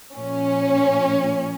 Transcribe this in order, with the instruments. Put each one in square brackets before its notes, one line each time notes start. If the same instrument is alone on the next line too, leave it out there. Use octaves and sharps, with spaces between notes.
[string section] A#2 F3 C#4